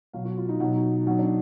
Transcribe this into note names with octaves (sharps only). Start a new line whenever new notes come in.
B2 F#3 F5
F#4
F4
D#4
B2 F#3 D#4
B2 F#3 D#4
D4